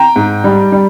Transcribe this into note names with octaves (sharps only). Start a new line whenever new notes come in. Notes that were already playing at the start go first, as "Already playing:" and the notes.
Already playing: G5 A#5
G#2
G3
G3